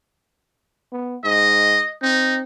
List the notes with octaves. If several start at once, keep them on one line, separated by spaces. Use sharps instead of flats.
B3
G#2 D#5
C4 D#4